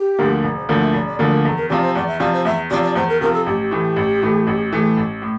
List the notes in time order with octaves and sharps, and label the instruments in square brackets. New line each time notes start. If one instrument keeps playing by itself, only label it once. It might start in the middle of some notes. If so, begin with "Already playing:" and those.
Already playing: [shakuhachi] G4
[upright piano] D2 D3 F3 A#3
[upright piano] E1 [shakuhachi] A#4
[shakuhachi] C5
[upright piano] D2 D3 F3 A#3 [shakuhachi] D5
[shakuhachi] E5
[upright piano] E1 [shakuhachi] D5
[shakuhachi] D5
[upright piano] D2 D3 F3 A#3 [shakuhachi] D5
[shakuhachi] A#4
[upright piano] E2 [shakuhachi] A4
[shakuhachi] A#4
[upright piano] C3 F3 C4 F4 [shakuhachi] D5
[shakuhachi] C5
[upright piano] E2 [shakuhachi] D5
[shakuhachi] E5
[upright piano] C3 F3 C4 F4 [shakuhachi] D5
[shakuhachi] C5
[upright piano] E2 [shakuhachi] E5
[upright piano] C3 F3 C4 F4 [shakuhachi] D5
[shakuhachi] D5
[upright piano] E2 [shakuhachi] C5
[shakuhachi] A#4
[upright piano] C3 F3 C4 F4 [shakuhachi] A#4
[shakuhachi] A4
[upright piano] A1 [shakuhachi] G4
[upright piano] A2 E3 A3
A1
A2 E3 A3
A1
A2 E3 A3
A1
A2